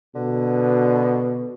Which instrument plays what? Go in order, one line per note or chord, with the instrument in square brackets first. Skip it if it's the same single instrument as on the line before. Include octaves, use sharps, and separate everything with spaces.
[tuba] B2 [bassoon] D3